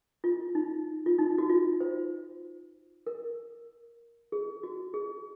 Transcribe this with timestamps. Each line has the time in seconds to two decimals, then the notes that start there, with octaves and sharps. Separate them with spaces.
0.24 F4
0.55 D#4
1.06 F4
1.18 D#4
1.38 F#4
1.50 F4
1.80 C5
3.06 A#4
4.32 G#4
4.63 F#4
4.94 G#4